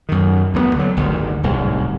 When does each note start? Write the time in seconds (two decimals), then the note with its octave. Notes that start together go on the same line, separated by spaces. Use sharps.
0.09 F#2 D#3
0.54 D2 G#3 B3
0.76 D3 F#3
0.97 G1 D2 G#2 D#3
1.43 D1 C2 G#2